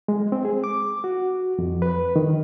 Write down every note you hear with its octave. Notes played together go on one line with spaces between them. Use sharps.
G#3
C4
G#4
D6
F#4
F2
B4
D#3